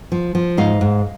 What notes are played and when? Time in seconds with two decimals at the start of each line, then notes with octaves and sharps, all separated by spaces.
0.12 F3
0.35 F3
0.57 G#2 D#5 F5
0.81 G#2